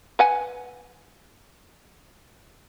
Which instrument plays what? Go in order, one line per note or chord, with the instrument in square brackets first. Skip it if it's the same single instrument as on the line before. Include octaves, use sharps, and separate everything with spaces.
[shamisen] B4 F#5 G#5